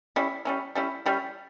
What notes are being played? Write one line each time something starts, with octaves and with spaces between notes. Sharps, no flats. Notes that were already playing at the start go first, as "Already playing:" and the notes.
G3 C#4 E4
G3 C#4 E4
G3 C#4 E4
G3 C#4 E4